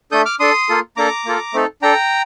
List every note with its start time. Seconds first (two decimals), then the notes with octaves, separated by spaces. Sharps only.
0.12 A3 D4 A4 D#6 G6
0.25 D6 F6
0.40 D4 A4 C6 D#6
0.69 A#3 F4 A4
0.97 A#3 D4 A4 A#5 D6
1.25 A#3 F4 A4
1.54 A3 C4 D#4 A4
1.82 D4 A4 G5 A#5